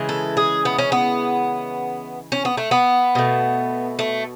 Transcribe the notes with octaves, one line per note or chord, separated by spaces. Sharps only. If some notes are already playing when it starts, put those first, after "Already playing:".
Already playing: C#3 E3 G#3
A4
G#4
B3
C#4
B3
C#4
B3
A3
B3
B2 A3
A3